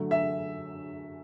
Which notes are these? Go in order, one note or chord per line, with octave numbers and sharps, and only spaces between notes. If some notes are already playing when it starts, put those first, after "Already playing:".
Already playing: D3 F#3 A3
E5